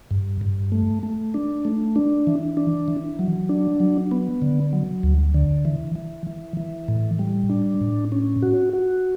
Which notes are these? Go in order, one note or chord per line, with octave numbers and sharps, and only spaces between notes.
G2
G2
A3
A3
D4
A3
D4
E3
D4
E3
F#3
D4
F#3
B3
D3
F#3
D2
D3
E3
E3
E3
E3
A2
G3
D4
A2
C#4
F#4
F#4